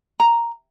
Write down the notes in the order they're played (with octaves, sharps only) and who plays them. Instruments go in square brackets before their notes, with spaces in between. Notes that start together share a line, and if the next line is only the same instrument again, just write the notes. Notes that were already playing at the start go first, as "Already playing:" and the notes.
[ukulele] A#5